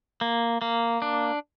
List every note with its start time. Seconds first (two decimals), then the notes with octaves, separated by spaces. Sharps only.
0.21 A#3
0.62 A#3
1.02 D4